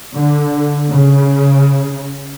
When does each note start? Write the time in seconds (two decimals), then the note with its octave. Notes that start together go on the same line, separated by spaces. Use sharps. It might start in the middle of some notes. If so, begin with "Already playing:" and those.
0.15 D3
0.91 C#3